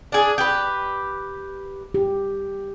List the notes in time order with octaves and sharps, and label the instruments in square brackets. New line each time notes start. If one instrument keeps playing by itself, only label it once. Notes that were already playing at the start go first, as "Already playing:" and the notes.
[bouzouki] D4 G#4
G4 B4
[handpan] G4